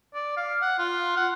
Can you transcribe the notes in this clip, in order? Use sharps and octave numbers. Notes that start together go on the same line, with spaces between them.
D5
F5
F#5
F4
F#5